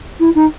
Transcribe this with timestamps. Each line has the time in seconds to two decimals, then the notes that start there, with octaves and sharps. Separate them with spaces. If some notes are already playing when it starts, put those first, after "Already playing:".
0.20 E4
0.35 D#4